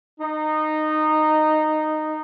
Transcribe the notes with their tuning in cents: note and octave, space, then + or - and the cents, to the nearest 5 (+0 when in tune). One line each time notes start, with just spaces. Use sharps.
D#4 -15